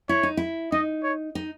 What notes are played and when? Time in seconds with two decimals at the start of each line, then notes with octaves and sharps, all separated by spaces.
0.09 E4 C#5
0.23 D#4
0.37 E4
0.72 D#4 D#5
1.04 C#5
1.35 D#4